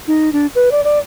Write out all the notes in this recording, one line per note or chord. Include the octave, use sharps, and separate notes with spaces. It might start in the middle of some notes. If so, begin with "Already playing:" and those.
D#4
D4
B4
D5
D5